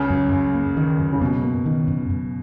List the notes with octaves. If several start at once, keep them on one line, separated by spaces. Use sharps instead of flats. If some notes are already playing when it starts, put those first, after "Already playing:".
Already playing: C#2 C#3
F#2
F#2
A#3
D#3
F#2
C#3
F#2 B2
A#3
D#3
F#2
F#2